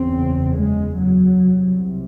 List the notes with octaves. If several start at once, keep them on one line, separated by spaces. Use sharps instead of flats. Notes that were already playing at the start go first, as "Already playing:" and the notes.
Already playing: F#1 E2 C#3 C4
G#3
F#3
C2 C3